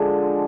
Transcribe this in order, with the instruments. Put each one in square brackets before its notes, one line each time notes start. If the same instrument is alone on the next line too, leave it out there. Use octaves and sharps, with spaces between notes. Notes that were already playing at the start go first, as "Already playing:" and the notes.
Already playing: [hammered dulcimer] D3 F3 G#3 D4